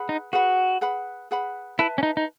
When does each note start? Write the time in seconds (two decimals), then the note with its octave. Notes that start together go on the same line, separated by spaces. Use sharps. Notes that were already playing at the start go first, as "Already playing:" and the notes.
Already playing: G#4 B4 F#5 B5
0.09 D#4
0.33 F#4 G#4 B4 F#5 B5
0.81 G#4 B4 F#5 B5
1.31 G#4 B4 F#5 B5
1.78 E4 B4 E5 A5
1.98 C#4
2.03 D#4
2.17 D#4